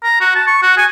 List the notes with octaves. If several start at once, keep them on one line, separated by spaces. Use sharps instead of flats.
A#5
F#4
A5
C#6
F#4
G#5